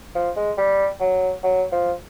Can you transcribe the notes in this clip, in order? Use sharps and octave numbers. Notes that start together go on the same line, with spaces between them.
F3
G#3
G3
F#3
F#3
F3